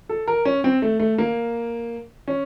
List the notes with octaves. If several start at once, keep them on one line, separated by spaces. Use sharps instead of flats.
A4
A#4
C#4
C4
A3
A3
A#3
C#4